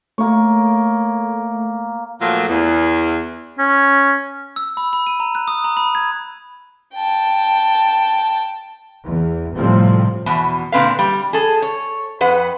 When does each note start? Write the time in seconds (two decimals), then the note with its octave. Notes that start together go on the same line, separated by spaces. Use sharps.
0.18 A3 A#3 C#5
2.21 A#2 F3 F#3 A3 F4
2.49 E2
3.58 C#4
4.56 E6
4.77 B5
4.93 B5
5.07 D#7
5.20 A#5
5.35 F#6
5.48 D#6
5.64 A#5
5.77 B5
5.95 G#6
6.95 G5 A5
9.03 E2
9.54 A2 C3 F3 G3 C4
10.26 E2 B2
10.72 A#2 D3 C4 B4 F5
10.99 G3
11.33 G#4 A4
11.62 C#5
12.21 F2 B4 F#5